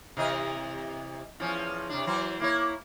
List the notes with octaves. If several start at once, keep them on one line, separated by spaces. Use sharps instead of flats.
C3 E3 D#5
E2 F3 C#4
C3 D4
E3 F#3 C5
A#3 E4 C#5